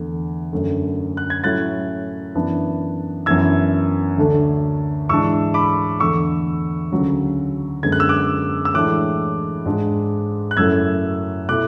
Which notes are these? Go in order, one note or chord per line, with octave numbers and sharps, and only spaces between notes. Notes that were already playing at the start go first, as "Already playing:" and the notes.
Already playing: E2 D3 A3
F#2 D3 A3
F#6
G#6
A2 F#3 A3 C#4 E4 F#6 A6
F#2 E3 B3 D4
F#2 E3 B3 D4 E6 G#6
D2 D3 A3 D4
G#2 E3 G#3 D4 C#6 E6
B5 D6
E2 D3 A3 C#6 E6
D2 C#3 F#3 C#4
F#2 D3 G#3 B3 G#6
F#6
E6
D6 F#6
E6
A2 E3 G#3 D4 D6 F#6
G#2 G#3 D4
F#6
F#2 C#3 F#3 A3 E4 E6 G#6
B2 A3 E4 D6 F#6